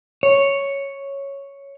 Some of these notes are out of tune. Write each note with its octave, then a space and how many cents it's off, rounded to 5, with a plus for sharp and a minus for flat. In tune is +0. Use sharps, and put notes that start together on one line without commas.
C#5 +0